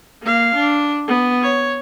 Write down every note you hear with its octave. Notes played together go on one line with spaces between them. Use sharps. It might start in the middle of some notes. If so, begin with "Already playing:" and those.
A#3 F5
D4
B3
C#5